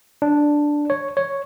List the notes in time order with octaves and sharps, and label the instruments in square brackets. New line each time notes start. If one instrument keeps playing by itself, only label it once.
[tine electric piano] D4
C#5
C#5